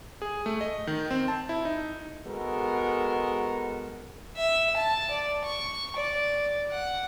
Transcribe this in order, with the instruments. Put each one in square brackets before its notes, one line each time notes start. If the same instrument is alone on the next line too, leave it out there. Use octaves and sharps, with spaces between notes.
[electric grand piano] G#4
A3
D#5
D#3
C4
A5
E4
D#4
[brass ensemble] G#3 B3 F#4 A4 A#4
[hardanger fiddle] E5
A5
D5
C#6
D5
F#5